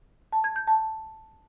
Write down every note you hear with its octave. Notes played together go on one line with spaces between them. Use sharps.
A5
G#6
G6
A5